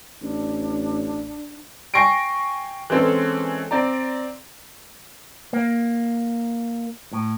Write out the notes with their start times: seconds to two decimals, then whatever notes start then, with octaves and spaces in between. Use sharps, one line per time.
0.22 A1 D4
1.94 G5 G#5 C#6 A#6 C7 D7
2.90 E3 G#3 C4 C#4 A4
3.71 C4 D5 A#5
5.53 A#3
7.13 A2